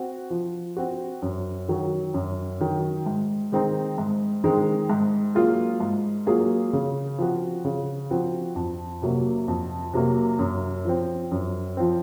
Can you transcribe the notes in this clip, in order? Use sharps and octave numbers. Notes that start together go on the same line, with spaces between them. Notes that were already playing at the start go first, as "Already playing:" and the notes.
Already playing: C4 F#4
F3
C4 F#4
F#2
D#3 F#3
F#2
D#3 F#3
G#2
D#3 G#3 C4 D#4
G#2
D#3 G#3 C4 D#4
G#2
F#3 A#3 F4 G#4
G#2
F#3 A#3 F4 G#4
C#3
F3 C4 F#4
C#3
F3 C4 F#4
F2
C3 F#3 A#3
F2
C3 F#3 A#3
F#2
F3 C4
F#2
F3 C4